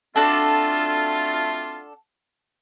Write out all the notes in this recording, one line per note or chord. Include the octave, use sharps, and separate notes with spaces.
A3 C4 D4 F4 F#4 A4